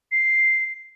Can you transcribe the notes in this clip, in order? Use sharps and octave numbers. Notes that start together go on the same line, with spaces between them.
C7